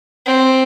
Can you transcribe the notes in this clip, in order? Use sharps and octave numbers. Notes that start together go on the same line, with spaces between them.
C4